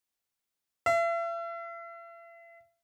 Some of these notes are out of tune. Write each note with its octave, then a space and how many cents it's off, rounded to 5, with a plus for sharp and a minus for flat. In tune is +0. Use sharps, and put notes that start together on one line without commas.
E5 +40